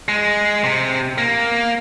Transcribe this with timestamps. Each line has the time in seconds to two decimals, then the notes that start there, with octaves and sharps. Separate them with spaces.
0.09 G#3
0.64 C3
1.18 A#3